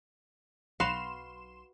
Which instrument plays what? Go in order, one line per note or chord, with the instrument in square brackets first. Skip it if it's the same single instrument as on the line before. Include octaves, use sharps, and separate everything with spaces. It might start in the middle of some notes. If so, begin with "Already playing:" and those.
[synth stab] B1 C6 E7 [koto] F#4 B4 F5